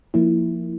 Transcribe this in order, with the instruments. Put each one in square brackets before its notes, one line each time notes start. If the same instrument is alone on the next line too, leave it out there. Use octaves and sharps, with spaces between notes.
[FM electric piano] F3 A#3 E4